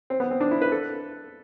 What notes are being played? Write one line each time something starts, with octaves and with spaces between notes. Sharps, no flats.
C4
B3
C4
D4
E4
B4
A4